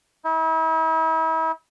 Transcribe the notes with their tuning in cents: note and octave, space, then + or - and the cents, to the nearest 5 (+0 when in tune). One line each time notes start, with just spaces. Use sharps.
E4 -40